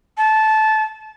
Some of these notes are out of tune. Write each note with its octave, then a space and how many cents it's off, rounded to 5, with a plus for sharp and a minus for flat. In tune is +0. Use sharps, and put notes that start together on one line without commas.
A5 -15